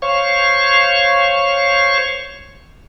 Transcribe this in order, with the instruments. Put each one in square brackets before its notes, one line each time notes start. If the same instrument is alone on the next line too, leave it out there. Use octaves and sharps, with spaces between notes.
[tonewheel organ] C5 C#5 F5 C#6